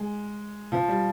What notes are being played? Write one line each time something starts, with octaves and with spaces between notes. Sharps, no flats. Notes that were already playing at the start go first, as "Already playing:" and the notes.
Already playing: G#3
F3
G3